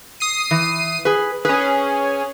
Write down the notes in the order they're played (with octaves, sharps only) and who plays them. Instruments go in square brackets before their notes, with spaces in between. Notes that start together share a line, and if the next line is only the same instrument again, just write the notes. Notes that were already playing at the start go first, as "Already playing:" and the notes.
[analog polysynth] D#6 C7 D#7
[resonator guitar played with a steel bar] E3
G#4 B4
[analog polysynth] C#4 G#4 [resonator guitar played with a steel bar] B4